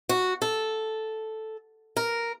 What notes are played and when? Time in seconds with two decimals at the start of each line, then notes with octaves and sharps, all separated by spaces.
0.09 F#4
0.42 A4
1.97 A#4